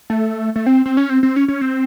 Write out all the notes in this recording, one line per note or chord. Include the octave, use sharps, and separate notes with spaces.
A3
A3
C4
C4
C#4
C4
C4
C#4
C#4
C4